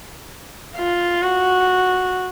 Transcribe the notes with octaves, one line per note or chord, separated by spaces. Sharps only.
F4
F#4